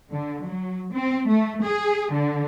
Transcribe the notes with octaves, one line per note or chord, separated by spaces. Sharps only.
D3
F#3
C4
A3
G#4
D3